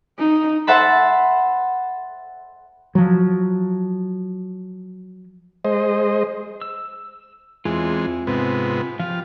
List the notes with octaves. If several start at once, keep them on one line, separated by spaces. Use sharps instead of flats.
D#4
C5 E5 F#5 A5 B5
F3 F#3
G#3 C5 D#5
E6
E2 G#3 C4 F4
G#2 C3 B3
F3 F4 G4